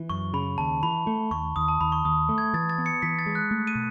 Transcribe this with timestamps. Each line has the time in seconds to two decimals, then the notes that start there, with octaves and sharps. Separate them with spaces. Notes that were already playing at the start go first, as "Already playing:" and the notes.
Already playing: E3
0.10 F#2 C#6
0.33 C#3 B5
0.58 D#2 A5
0.83 E3 B5
1.07 A3
1.31 D#2 C#6
1.56 D#2 D#6
1.68 A5
1.81 D#2 B5
1.92 C#6
2.05 D#2 D#6
2.29 A3
2.38 G#6
2.54 E3 A6
2.70 A6
2.78 B3
2.86 C#7
3.02 E3 B6
3.19 A6
3.26 G#3
3.35 F#6
3.51 A3
3.67 D#7
3.75 B2